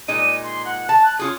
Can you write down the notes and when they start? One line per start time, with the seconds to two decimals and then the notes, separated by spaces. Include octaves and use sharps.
0.08 A#2 G#3 D#4 D#7
0.43 C6
0.65 F#5
0.89 A5
1.03 F#6
1.19 C#4 F4 G#4 D#6